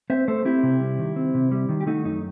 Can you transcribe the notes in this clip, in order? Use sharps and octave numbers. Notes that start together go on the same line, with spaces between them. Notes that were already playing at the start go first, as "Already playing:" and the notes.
C4 C5 E5
A3 A4 C5
C4 E4 G4
C3
G3
D#3
C4
C3
G3
D#3
G4
A3 D#4 F#4
F#2 D#4